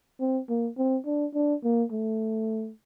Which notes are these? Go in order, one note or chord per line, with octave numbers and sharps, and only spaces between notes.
C4
A#3
C4
D4
D4
A#3
A3